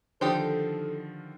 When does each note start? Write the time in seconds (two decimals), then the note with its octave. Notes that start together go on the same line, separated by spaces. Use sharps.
0.21 D3 D#3 F3 D#4 G4 A4 C5